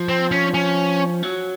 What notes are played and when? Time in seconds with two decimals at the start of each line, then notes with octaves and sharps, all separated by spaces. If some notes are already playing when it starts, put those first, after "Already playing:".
Already playing: F3
0.09 C4
0.31 C#4
0.54 C#4
1.23 F#3